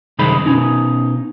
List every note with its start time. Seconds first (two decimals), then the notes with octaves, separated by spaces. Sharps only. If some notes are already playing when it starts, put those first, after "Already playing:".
0.19 F#2 C3 D#3 G#3 D#4 B5
0.46 B2 C#4 D#4